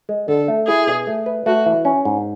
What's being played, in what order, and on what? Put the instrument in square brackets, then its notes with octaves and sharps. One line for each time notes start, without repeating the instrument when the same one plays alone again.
[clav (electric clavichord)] G#3
[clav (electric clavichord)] D3 [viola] A4
[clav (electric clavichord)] A3
[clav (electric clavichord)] E4 [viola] G#4
[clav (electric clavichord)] B2
A3
B4
[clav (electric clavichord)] A3 [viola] F#4
[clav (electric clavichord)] E3
C#4
G#2